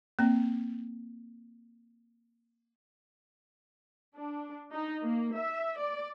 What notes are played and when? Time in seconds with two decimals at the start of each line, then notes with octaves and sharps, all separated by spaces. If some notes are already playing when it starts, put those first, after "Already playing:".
0.19 A#3 C4
4.15 D4
4.73 D#4
5.04 A#3
5.37 E5
5.79 D5